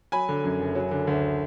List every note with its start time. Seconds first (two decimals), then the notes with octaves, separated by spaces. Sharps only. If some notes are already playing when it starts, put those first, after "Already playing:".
0.12 F#3 G#5 B5
0.29 D3
0.44 F#2
0.60 F#1
0.75 F#3
0.91 D3
1.07 D2